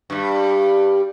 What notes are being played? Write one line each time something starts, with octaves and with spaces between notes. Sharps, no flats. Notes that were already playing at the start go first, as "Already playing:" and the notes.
G2 G3